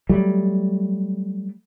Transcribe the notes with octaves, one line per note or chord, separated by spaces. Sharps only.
F#3 G3 A3